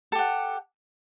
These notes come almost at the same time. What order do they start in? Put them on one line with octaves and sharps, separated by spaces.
A4 G4 F#5